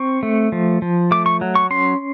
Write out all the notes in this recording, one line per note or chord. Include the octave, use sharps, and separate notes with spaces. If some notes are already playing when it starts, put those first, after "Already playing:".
Already playing: C4 C#6
A3
F3
F3
A3 D6
C#6
F#3
C#6
C#4 C6